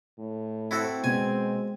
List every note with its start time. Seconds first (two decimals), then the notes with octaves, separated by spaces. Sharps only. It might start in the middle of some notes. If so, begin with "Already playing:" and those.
0.19 A2
0.71 C4 E4 F#4 A4
1.04 B2 G#3 G#5